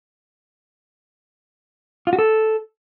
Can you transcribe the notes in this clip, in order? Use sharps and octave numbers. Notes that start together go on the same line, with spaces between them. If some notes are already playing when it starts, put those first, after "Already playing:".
F4
F#4
A4